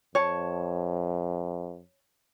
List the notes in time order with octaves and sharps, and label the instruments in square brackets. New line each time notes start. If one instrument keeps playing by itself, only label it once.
[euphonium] F2 [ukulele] C#5 A5